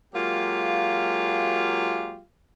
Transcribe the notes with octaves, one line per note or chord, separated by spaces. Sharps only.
F#3 G#3 A#3 F4 G4 F5